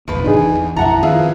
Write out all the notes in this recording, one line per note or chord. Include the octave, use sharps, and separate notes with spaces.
F#1 B1 F2 F3 B4
G#1 C3 D4 D#4 G#4
E3 G#5
E2
B1 F#2 F3 E4 E5 F#5 A5 A#5
D#3 C4 F4 G#4 B4 E5 F5